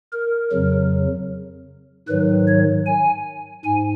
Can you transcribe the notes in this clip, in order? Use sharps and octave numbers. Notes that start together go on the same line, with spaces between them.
A#4
F2 C#3 F#3
G#2 D#3 F#3 B4
C#5
G#5
G#2 G#5